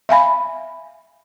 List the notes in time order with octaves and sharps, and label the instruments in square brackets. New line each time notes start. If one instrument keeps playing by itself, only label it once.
[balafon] E5 F5 G#5 B5